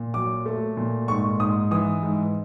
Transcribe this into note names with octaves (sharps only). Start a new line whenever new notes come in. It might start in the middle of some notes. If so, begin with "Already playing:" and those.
Already playing: A#2
F#3 D6
A3
A#2
G#2 C#6
G#2 D#6
E3 D#6
G#2